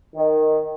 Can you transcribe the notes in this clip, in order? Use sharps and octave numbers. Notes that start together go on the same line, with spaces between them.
D#3